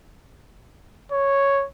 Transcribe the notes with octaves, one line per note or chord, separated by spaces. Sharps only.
C#5